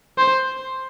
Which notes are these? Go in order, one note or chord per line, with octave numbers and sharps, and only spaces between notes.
C5